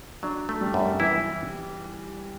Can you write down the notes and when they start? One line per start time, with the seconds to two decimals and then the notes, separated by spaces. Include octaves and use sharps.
0.23 F#3 D4
0.49 A3
0.61 G3
0.74 F#2
0.80 G3
1.00 E3 E4